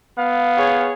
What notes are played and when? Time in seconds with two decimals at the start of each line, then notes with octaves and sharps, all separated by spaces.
0.18 B3 F5
0.57 G#4 C#5